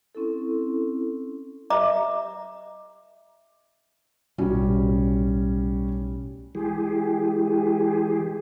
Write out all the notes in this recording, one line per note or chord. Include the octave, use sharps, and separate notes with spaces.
C4 C#4 E4 A4
D#5 E5 A#5 D6
B1 A2 G3 C#4 F#4
E3 G#3 G4 G#4